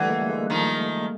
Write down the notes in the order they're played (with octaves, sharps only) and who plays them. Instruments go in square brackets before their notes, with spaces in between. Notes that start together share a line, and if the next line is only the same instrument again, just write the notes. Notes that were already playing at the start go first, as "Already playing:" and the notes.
Already playing: [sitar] D3 E3 [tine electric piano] G3 A3
[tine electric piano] G#3 A#3
G#3 A#3
[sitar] D#3 F3